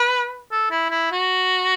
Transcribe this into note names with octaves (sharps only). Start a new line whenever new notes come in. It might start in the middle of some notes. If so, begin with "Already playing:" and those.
Already playing: B4
A4
E4
E4
F#4